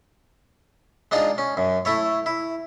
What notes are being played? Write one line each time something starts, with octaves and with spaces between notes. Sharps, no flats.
G#3 D4 D#4 F4
C#4
F#2
A3 E4 C#5
E4